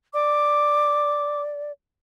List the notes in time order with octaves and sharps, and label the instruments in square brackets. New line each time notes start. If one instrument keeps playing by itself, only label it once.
[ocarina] D5 [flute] D6